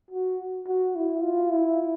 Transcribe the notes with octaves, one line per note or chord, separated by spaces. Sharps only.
F#4
F#4
E4
F4
E4